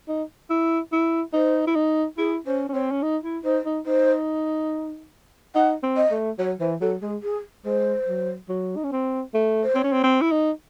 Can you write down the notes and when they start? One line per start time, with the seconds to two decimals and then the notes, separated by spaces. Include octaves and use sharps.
0.08 D#4
0.50 E4
0.92 E4
1.33 D#4 C5
1.67 E4
1.75 D#4
2.17 E4 G#4
2.46 C#4 C5
2.69 C#4
2.73 C4 C#5
2.91 C#4
3.02 D#4
3.24 E4
3.44 D#4 C5
3.65 D#4
3.86 D#4 C5
5.55 D#4 F#5
5.83 C4
5.96 D#5
6.11 A3
6.39 F#3 C#5
6.60 E3 C5
6.81 F#3 A4
7.02 G#3 G#4
7.22 G#4
7.65 G#3 C5
8.07 F#3
8.49 F#3
8.77 D#4
8.84 C#4
8.92 C4
9.34 A3
9.63 C5
9.75 C4 C#5
9.84 C#4
9.92 C4
10.03 C4
10.21 E4
10.31 D#4